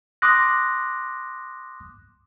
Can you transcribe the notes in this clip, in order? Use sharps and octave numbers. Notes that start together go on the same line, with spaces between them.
C6 D6 D#6 F#6 A#6